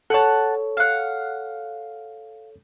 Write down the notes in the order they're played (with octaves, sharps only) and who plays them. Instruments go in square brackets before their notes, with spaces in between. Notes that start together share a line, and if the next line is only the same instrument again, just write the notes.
[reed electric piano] A4 C#5 [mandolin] F#5 G5 A5
[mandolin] F5 F#5